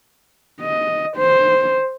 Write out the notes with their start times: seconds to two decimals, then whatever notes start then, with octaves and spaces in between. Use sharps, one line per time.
0.62 D#5
1.17 C5